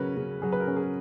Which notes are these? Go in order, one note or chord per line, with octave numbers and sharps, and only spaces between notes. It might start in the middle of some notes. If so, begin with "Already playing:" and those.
Already playing: C#3 F#3 C#4 A#4 B4
C#3
F#3 G#4
B4
A#4
C#4
G#4